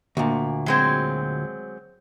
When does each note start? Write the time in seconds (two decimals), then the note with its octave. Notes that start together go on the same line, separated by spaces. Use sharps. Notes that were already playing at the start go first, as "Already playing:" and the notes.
0.17 D2 A#2
0.66 F#3 G#3 C4